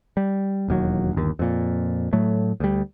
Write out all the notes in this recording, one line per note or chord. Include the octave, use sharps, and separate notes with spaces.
G3
E1 D#2 F#3
G1 D#2
F2 A#2
A2 F#3 A3
D2 G3